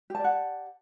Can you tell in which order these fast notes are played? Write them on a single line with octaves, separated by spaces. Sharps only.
G4 A5 D5 F#5